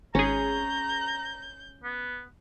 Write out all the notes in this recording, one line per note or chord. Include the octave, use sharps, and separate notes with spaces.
G#1 C#4 G#4 A#5 G6
B3